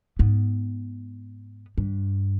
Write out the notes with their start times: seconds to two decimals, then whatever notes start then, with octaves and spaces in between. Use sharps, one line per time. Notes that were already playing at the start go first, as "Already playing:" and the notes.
0.19 G#2 B3
1.78 G2